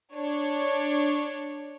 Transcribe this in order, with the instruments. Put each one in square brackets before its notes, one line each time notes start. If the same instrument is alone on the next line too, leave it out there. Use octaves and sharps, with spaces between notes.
[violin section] D4 C#5